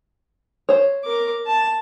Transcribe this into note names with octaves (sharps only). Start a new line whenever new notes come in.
C5 C#5
A#4 D6
A5